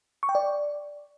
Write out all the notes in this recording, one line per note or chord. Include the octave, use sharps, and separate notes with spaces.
C#6
G5
D5